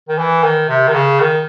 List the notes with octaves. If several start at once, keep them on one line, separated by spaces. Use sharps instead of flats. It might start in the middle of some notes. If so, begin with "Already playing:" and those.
D#3
E3
D#3
C3
D#3
C#3
D#3